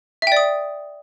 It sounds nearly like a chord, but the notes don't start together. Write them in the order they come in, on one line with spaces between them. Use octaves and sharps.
E5 G5 D5 D#6